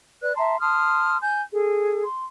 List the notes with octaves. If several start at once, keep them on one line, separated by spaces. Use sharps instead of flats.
B4 D5 F#6
E5 A5 A#5 C6
A5 C6 D#6 F6
G#5 G6
G#4 A4
C6